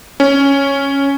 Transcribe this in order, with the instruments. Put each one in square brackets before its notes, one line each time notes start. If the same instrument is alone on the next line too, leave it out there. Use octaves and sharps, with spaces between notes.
[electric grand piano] C#4